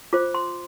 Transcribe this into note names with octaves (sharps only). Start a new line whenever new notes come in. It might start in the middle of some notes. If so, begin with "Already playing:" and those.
F4 C5 D6
C6